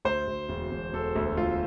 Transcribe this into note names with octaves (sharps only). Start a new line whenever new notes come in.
D2 C5
D2
E1
E1
E1 A4
D2
D2 F4